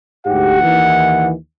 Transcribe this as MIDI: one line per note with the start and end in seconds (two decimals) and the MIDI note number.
0.26 0.57 38
0.26 0.57 44
0.26 0.57 67
0.26 1.29 78
0.61 1.33 39
0.61 1.33 51
0.61 1.33 52